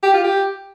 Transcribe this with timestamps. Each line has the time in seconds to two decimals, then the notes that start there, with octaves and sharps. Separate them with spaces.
0.03 G4
0.14 F4
0.24 G4